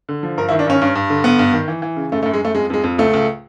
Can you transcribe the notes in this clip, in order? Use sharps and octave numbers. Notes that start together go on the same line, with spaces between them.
D3
F3
G2 A#4
E4
D#3
D4
G2 C#4
G2
G2
D3
G2 B3
G2
D#3
E3
E3
C#3
F#2 A3
A3
F#2
G#3
F#2 A3
F2 G#3
F2 G#3
F2
C#2 A3
C#2